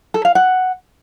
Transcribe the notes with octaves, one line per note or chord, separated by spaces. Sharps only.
A4
F5
F#5